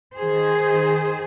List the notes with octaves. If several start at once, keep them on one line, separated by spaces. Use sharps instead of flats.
D#3 G#4 C5